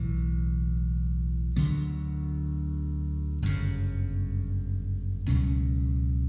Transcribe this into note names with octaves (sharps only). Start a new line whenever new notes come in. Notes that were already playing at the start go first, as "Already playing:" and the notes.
Already playing: B1 A2 E3
D2 D3 F#3 B3
G1 F#2 C#3
C#2 B2 F#3 C#4